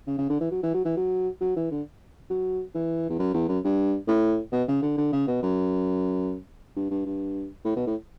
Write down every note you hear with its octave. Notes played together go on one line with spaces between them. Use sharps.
C#3
C#3
D3
E3
F#3
E3
F#3
E3
F#3
F#3
E3
D3
F#3
E3
E2
F#2
E2
F#2
G2
A2
B2
C#3
D3
D3
C#3
B2
F#2
G2
G2
G2
A2
B2
A2